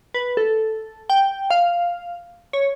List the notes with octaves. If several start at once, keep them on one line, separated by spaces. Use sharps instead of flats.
B4
A4
G5
F5
C#5